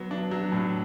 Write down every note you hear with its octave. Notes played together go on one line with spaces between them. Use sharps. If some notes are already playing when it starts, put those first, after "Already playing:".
Already playing: F#3 B3
D4
F#3
A2